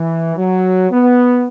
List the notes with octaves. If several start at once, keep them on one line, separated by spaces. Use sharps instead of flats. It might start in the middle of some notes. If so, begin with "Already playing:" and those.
Already playing: E3
F#3
B3